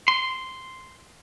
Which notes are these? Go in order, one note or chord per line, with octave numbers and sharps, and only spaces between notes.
C6